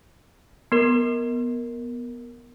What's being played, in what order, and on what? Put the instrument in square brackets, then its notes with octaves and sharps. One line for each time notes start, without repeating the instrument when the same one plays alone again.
[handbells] B3 A#4